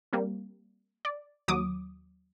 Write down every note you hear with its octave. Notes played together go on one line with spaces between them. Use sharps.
G3 A#3 C4
D5
D#2 F#3 D6 D#6